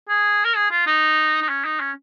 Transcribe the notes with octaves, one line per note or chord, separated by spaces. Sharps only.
G#4
A#4
G#4
F4
D#4
D#4
C#4
D#4
C#4